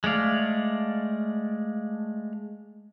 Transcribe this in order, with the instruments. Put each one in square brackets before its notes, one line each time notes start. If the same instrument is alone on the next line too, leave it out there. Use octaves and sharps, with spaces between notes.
[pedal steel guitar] G#3 A3 D5 F5